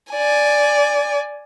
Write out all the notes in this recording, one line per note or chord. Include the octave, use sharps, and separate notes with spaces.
D5 G#5